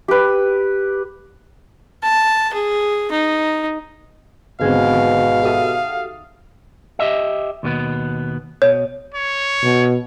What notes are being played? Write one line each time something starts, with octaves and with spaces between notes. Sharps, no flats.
G4 B4
A5
G#4
D#4
G#1 B2 D3 G#3 B3 C4 F5 G#6
F#4 G4 A4 E5 D#6 A6
G4 D#5 E5
D#2 B2 B3
B2 C#5
C#5
B2